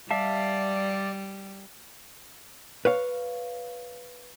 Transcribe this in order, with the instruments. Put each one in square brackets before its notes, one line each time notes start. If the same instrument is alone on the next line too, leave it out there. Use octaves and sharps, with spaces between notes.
[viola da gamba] G3 [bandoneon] D5 [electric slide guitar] E5 F5 A5
[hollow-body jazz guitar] B4 C#5 F5